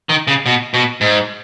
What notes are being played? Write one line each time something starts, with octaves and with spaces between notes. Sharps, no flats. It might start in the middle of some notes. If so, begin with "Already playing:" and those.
D#3
C#3
B2
B2
G#2